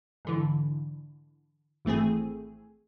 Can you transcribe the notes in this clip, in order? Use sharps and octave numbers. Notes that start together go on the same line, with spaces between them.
G#2 D3 E3
G#1 E3 A3 C4 G#4